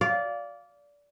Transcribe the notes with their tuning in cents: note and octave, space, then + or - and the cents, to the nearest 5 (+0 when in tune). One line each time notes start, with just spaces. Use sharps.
D5 -20 F5 +0